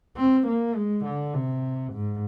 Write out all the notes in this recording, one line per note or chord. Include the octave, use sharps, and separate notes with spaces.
C4
A#3
G#3
D3
C3
G#2